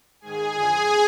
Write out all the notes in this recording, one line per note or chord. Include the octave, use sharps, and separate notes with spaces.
G#2 D#3 G#4 G#5
F2 D3 F3